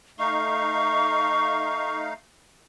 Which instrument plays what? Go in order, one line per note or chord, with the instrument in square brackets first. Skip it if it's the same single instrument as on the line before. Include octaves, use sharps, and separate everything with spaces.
[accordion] A3 D#4 F5 [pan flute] C#6